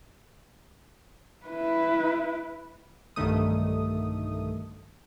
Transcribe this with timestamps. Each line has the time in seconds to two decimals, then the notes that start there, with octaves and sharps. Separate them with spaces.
1.46 E4 B4
3.16 B1 G2 D3 D#3 A3 D#6